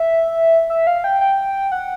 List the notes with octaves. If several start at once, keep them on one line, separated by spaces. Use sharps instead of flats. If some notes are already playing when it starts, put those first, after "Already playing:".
Already playing: E5
E5
F5
G5
G5
F#5